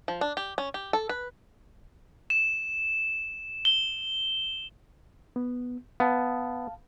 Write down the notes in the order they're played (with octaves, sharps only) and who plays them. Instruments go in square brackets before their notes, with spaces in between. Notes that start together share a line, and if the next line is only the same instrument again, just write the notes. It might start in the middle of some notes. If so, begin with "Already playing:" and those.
[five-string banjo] F3
D4
G4
C#4
G4
A4
B4
[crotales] E7
G7
[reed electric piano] B3
[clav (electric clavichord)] B3 [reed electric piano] F5 A5